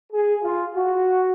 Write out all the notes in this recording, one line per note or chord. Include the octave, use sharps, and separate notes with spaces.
G#4
F4
F#4